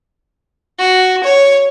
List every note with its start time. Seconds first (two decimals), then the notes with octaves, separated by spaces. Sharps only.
0.78 F#4
1.24 C#5